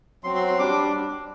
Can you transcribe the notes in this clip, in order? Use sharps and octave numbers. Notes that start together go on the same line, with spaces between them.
F#3 C4 F#4 C6
C6
C6
G3 D4 D6